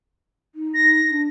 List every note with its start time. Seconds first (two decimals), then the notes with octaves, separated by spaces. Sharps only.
0.55 D#4
0.74 A#6
1.10 D4